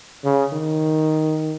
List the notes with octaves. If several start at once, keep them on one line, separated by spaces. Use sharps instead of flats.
C#3
D#3